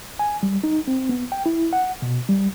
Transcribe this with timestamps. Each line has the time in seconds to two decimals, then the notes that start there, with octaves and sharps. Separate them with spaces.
0.19 G#5
0.43 G3
0.64 D#4
0.88 C4
1.09 B3
1.32 G5
1.46 E4
1.73 F#5
2.02 B2
2.29 G3